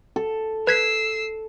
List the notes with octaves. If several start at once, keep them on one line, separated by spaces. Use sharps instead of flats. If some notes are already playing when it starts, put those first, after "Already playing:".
A4
B4 E6 G#6 B6 C7